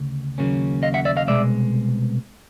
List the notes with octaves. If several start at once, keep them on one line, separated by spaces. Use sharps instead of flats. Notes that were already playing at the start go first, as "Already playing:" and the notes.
Already playing: D2 C#3
D#2 C#3 F#3 A#3 C#4
D#5 F5
E5 F#5
D5 E5
D#5 F5
C2 B2 G#3 D5 E5